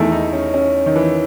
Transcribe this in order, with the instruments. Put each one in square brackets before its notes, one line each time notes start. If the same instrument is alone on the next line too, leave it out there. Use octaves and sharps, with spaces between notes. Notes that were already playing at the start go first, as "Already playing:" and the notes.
Already playing: [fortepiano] E2 D#3 A3 [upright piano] E4
[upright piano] D#4
C#4
C#4
D#3
E3